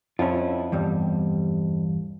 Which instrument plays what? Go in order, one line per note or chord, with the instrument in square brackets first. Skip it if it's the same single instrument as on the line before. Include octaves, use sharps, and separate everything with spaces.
[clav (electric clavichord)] F2 [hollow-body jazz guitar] C#4 E4 F4
[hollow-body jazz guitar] E2 G2 G3